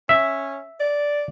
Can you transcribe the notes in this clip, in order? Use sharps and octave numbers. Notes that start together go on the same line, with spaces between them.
C#4 E5
D5